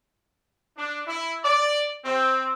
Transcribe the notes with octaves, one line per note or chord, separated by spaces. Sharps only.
D4
E4
D5
C4